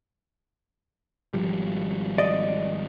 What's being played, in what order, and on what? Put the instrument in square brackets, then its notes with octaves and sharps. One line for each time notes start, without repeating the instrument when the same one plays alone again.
[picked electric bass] G#1 F3 G3
[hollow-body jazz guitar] D5 D#5